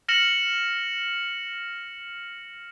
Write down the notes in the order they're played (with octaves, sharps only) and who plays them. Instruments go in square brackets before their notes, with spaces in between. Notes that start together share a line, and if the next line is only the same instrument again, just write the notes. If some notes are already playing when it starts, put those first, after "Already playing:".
[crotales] F6 A#6 C#7 E7 F#7